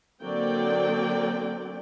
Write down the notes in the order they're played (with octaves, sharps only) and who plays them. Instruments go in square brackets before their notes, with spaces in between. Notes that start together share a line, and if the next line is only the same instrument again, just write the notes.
[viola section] D3 F#3 A#3 C4 D5 G5